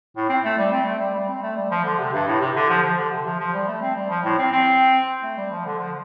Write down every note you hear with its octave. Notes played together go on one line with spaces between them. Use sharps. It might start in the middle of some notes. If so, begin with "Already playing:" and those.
A2
C4
A3
G3
C4
A3
G3
G3
C4
A3
G3
F3
D3
C3
G2
A2
C3
D3
F3
F3
D3
C3
F3
F3
G3
A3
C4
G3
F3
A2
C4
C4
A3
G3
F3
D3
F3